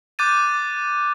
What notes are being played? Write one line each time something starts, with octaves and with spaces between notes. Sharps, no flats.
D6 F#6 G6 A6 D#7